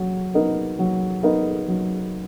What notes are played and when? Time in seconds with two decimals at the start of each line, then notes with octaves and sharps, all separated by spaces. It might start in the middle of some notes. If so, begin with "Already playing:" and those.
Already playing: F#3
0.34 B3 D#4 A#4 D#5
0.79 F#3
1.23 B3 D#4 A#4 D#5
1.68 F#3